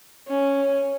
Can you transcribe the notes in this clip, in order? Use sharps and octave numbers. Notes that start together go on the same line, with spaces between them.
C#4